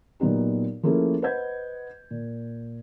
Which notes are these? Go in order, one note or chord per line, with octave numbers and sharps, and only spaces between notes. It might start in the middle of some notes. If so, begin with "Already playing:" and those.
A#2 F#3 B3 D#4 G4
F3 A3 A#3 C#4 E4 G#4
B4 C5 D#5 F#5 G6 G#6
A#2